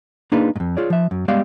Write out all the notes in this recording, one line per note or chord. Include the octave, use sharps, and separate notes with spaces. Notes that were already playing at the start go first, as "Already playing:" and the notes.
A#3 D4 D#4 F4 G#4 B4
F2 G#2
F4 G#4 C#5 D5
F3 E5
F#2
G3 G#3 B3 G4 D5 F5